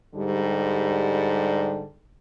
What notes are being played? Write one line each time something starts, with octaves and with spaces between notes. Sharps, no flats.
G#2 D3 G3